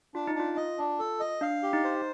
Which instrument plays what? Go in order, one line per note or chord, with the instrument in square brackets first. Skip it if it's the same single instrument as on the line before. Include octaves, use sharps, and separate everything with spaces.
[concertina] D4 [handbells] F4
[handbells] D#4
[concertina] D4 [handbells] F4
[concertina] D#5
D4
A4
D#5
[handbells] D4 [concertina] F5
[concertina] G4
[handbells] D#4
[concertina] C5